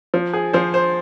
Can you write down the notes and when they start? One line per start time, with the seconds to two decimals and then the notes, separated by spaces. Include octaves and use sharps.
0.14 F3
0.33 G#4
0.53 F3 C5
0.74 C5